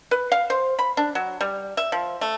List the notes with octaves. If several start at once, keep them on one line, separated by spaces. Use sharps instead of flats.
B4
F5
C5
B5
D4
F#3
G3
E5
F3
A3